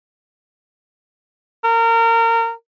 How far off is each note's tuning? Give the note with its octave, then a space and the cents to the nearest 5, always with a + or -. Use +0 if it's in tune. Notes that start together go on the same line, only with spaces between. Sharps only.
A#4 -25